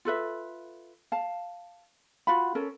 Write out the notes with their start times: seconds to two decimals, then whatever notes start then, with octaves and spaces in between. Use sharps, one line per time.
0.05 F4 A4 B4 E5
1.12 F5 A5
2.27 F4 F#4 F5 B5
2.55 C#4 A4 A#4